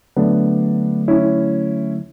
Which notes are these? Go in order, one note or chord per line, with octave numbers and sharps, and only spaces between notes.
D3 F#3 A3 B3 D4
C#4 E4